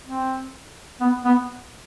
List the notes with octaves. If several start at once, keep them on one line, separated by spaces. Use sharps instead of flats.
C4
B3
B3